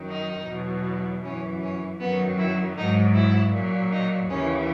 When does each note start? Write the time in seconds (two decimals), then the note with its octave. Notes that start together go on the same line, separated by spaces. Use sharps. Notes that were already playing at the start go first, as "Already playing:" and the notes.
Already playing: F#2 D#3 F#3
0.10 D#4
0.47 E2 B2 F#3
1.23 F#2 E3 C#4
1.62 C#4
2.00 F#2 D#3 F#3 B3
2.38 E4
2.77 G#2 F#3 D#4
3.14 E4
3.53 A#2 F#3
3.91 D#4
4.29 D#2 C#3 E3 C#4